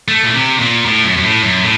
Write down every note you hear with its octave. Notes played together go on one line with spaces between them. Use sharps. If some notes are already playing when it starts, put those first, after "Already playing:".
A3
A#2
C3
A#2
A2
F#2
F#2
A2
F#2
A2